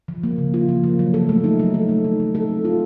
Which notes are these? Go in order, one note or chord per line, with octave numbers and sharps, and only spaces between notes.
F3
A#3
C#3
F4
F3
A#3
F#3
A4
A3
D#4
F#3
A4
A3
D#4
F#3
A4
C4
F4